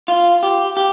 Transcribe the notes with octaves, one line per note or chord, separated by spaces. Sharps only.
F4
G4
G4